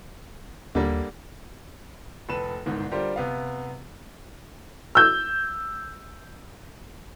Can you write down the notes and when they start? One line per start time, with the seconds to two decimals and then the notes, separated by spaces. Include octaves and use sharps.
0.75 D#2 D3 G3 A#3
2.29 F1 A4 B4 E7
2.66 G1 C2 G#2 D#3
2.91 D3 G3 F4 G4 A#4 C5
3.16 C3 B3 F5
4.95 E6 G6